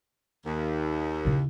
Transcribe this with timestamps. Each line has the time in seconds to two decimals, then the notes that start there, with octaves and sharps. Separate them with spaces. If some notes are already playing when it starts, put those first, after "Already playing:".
0.46 D#2
1.25 C#3 E4